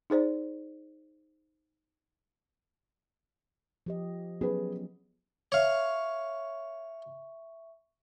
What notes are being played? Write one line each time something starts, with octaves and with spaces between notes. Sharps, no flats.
D#4 G#4 C5 D5
F3 G4 D#5
F#3 B3 C#4 G#4 B4
C#5 E5 F5 C#6